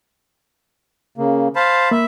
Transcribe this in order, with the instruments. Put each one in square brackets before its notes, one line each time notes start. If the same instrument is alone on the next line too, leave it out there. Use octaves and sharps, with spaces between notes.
[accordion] C#3 A#3
[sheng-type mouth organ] C5 F5 A5 [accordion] B5
[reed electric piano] A#3 [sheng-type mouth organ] E5